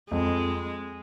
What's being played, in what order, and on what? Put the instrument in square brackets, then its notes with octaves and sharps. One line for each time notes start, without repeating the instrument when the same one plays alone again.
[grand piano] F2 [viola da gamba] G#3